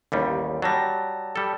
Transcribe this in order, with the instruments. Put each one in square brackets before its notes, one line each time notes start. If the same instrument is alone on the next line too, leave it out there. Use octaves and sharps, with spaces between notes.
[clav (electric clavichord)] A1 D#2 G3
[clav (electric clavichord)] F#3 G3 [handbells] D5 A5 A#6
[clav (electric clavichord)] G3 A4